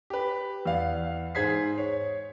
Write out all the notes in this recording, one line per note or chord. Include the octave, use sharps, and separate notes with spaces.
G4 B4
E2 D5 F5
G#2 G#4 C5 G#6 B6 C7
C#5